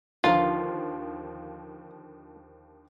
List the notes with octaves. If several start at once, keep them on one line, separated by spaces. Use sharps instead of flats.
D#2 D3 F3 F4 B4 F5 A#5